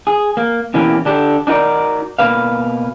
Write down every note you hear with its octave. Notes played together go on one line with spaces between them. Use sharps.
G#4
A#3
B2 E3 A#3 C#4 G4
D3 D4 G4 A4
D4 D#4 F#4 A#4 D5
B2 A#3 B4 F5